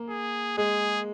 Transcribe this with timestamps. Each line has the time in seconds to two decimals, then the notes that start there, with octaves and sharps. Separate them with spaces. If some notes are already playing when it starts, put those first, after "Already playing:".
Already playing: A#3
0.10 G#4
0.57 G#3 G#4